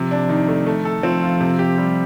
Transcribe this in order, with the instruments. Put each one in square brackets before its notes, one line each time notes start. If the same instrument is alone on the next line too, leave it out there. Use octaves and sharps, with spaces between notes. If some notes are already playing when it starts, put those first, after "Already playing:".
Already playing: [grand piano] C3 [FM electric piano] F3
[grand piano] D4
D#3
A3
A3
A4
[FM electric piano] F3 [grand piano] C4
[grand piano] F4
C3
G4
G3